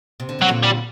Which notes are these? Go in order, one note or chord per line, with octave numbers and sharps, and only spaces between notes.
C3
D3
C3 F#3
A#2 D3
G3